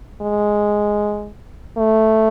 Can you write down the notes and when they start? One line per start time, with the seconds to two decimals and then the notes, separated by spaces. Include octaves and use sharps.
0.21 G#3
1.78 A3